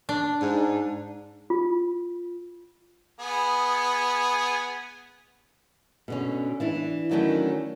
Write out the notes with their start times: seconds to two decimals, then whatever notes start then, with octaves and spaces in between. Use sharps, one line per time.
0.09 D4
0.42 G#2
1.50 F4
3.20 B3 G#4
6.08 B2 D3 C#4
6.60 E3 D4 E4
7.11 D#3 F#3 A3 C#4 D4 E4